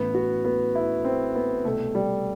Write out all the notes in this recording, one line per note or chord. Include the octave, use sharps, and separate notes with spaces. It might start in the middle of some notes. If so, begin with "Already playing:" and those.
Already playing: A1 A2 E3 B3
F#4
B3
E4
C4
B3
C2 B2 A3
G3